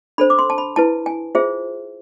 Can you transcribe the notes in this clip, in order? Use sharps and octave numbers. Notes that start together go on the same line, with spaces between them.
D4 A4 C5 B5
D6
C6
A5
B5
E4 B4 A5
G#5
F4 G#4 C5 E5